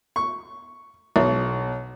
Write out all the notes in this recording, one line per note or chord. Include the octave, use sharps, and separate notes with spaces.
C#6
B1